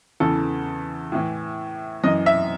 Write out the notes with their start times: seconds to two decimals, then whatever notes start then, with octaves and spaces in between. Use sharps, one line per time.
0.20 E2 C#3 E3 A4
1.12 A2 E3
2.03 F#2 E3 D#5
2.26 E5